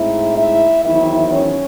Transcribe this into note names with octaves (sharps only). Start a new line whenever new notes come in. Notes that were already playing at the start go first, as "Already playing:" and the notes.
Already playing: A2 G#3 C4 D#4 E4 E5
E4 E5
E2 D#3 F#3 C4 E4 E5
C#4 C#5